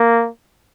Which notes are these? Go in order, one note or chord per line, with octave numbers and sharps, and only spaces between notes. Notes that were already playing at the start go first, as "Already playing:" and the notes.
Already playing: A#3